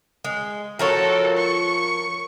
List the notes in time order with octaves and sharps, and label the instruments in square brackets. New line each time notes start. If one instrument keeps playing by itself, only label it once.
[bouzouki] G#3
[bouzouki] F3 A#4 C#5 [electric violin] F#4 A4
[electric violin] C#6